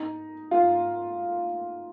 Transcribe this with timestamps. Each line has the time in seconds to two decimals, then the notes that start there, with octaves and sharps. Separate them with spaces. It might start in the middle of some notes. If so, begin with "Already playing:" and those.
Already playing: D#4
0.51 F4